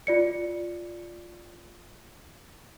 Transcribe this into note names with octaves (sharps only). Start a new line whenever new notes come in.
F4 D5 C#7